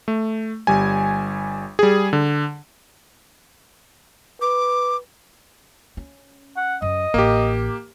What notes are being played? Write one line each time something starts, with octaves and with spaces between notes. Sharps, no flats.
A3
G1 G3 G#5
G3 G#4
D3
B4 D6
C#4
F#5
F#2 D#5
A1 A#3 G4